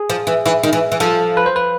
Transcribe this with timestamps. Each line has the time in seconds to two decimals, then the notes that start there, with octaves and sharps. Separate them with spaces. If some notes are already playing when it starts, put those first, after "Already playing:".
Already playing: G#4
0.10 F3
0.27 E3
0.46 E3
0.63 D#3
0.73 E3
0.92 E3
1.00 F3 A4
1.37 B4
1.46 C5
1.56 B4